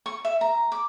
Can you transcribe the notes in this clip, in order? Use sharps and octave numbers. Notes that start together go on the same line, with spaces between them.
C#6
E5
A#5
D6